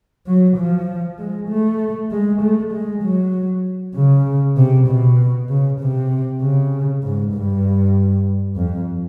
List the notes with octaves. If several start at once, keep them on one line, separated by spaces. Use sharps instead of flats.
F#3
F3
G#3
A3
G#3
A3
G#3
F#3
C#3
C3
B2
C#3
C3
C#3
G#2
G2
F2